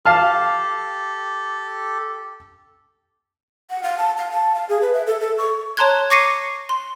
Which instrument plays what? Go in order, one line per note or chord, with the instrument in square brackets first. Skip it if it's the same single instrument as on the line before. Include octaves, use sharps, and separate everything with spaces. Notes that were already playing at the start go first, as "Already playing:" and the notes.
[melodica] G4 A4 [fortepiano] F5 A5 F6
[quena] F#5
F5
A5
F5
A5
F5
G#4
B4
E5
A4
A4
C#6
[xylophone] C#5 A5 A#5 C6 F#6 G#6
C#6 D6 A#6 C7 C#7 D#7
C6